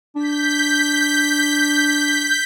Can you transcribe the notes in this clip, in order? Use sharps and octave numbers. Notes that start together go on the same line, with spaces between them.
D4 G6 B6